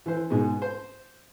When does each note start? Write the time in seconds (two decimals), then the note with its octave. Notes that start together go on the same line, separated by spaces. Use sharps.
0.06 E3 C5
0.30 G#2 B2 G#3
0.62 C5